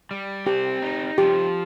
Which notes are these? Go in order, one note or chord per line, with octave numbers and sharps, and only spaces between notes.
G3
C4 G4
D#4
F3 G4